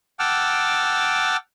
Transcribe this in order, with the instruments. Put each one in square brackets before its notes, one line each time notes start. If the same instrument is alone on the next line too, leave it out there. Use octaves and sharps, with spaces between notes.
[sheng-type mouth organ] F#5 G5 A5 D6 E6 F6